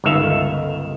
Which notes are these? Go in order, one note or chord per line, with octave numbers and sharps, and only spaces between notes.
G1 C#2 D#3 A4 E5 F5